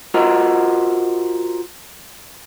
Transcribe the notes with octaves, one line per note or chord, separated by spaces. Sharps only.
F4 F#4 A#4 C5 D#5